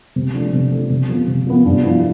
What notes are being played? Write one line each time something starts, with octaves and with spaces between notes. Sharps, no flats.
C3
F3 A3 D4
C3
F3 A3 D4
C3
F3 B3
C3
F3 B3
G2
F3 B3 E4